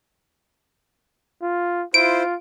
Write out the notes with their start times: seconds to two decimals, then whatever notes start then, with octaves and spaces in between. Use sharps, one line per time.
1.42 F4
1.94 E4 F4 C5 D7